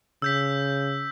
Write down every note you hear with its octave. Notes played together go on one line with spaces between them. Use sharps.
C#3 E6 G6 B6